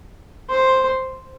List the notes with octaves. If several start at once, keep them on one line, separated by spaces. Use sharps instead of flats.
C5